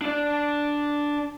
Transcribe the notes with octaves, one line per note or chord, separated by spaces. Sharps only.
D4 D5